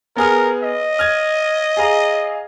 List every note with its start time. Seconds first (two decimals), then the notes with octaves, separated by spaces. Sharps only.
0.16 B3 G#4 A#4 F6
0.62 D#5
0.99 F6 G#6
1.77 G#4 F5 A#5